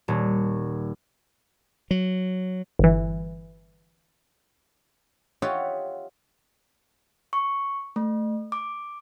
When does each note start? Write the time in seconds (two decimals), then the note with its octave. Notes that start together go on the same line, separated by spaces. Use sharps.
0.08 D#1
1.91 F#3
2.79 G1 E3
5.42 F4 G4 C#5 D#5 E5 F#5
7.33 C#6
7.96 A3
8.52 D6